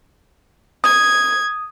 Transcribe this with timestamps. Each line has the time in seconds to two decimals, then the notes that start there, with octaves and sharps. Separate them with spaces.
0.84 D#6 G#6